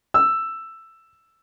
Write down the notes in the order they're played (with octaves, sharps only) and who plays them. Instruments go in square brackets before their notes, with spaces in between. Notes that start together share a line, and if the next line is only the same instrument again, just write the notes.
[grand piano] E6